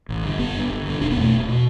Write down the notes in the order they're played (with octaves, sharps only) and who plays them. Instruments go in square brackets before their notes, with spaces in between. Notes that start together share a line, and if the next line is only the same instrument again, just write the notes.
[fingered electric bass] A1
G2 D3
G1 B3
G2 D3
G1
G2 D3
E1 D4
B3
E2 B2 A3
E1
B2